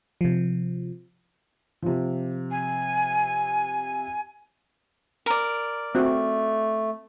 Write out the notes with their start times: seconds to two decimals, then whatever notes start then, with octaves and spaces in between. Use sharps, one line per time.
0.21 C3 F3
1.83 C3 F3
2.51 G#5
5.26 A#4 D5
5.95 A3 C4 F#4